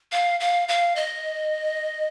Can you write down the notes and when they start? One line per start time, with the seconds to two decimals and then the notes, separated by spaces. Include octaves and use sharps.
0.12 F5
0.40 F5
0.68 F5
0.96 D#5